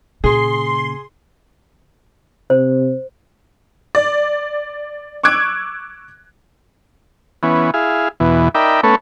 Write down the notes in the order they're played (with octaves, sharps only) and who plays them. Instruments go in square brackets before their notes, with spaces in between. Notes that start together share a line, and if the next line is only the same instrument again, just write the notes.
[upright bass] A#2 C#3 [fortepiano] G#4 [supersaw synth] C6
[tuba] C3 [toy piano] C5
[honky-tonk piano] D5
C#6 D6 E6 F#6 G#6 D7
[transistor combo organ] E3 B3 C#4
E4 G#4 F5
E2 B2 E3
D#4 A#4 D5 E5 G5 B5
A3 B3 C#4 A4 B4 C#5